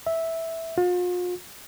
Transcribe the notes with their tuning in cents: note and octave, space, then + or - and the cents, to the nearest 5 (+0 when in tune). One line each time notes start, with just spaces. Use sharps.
E5 -10
F4 +40